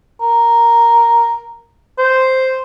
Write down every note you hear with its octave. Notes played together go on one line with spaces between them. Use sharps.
A#4
C5